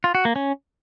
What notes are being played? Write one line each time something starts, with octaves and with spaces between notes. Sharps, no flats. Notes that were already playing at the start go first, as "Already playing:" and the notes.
F4
F#4
A#3
C#4